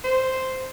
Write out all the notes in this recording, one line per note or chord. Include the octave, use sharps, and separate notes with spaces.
C5